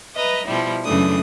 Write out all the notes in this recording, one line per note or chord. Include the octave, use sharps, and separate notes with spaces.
B4 D#5 E5 A#5
B2 F3 G3 E4
F#2 C#3 E3 A3 D4 D#6